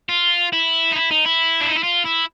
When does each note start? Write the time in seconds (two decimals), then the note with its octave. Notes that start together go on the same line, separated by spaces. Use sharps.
0.09 F4
0.53 E4
0.92 D#4
0.96 E4
1.11 D#4
1.25 E4
1.61 D4
1.69 D#4
1.76 E4
1.84 F4
2.05 E4